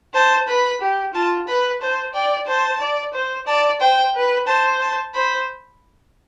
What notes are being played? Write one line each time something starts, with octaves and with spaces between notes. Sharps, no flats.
C5 A5
B4 B5
G4
F4 A5
B4 B5
C5 A5
D5 G5
C5 A5
D5
C5
D5 A5
C5 G5
B4
C5 A5
A5
C5 B5